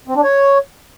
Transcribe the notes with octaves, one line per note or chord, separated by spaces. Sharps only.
C4
D4
C#5